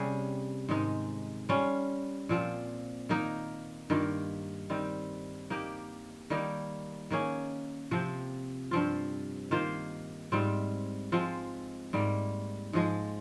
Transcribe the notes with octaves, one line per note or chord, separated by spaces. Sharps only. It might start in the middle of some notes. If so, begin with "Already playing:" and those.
Already playing: C3 G3 A#3 C#4 G#4
G#2 D#3 G#3 D#4
G3 C#4 F4
A#2 F3 C4 F4
D#3 A#3 D#4 A#4
G2 D#3 A#3 F4
D#3 G3 C4
A#3 D#4 G4
D#3 G3 A#3 D#4
D#3 A#3 C#4 G#4
C3 F3 C4
G2 F3 C4 F4
D#3 A#3 F4 C5
G#2 G3 C4 F4
F3 G#3 C4 F4
G#2 G3 A#3
G#2 F3 G#3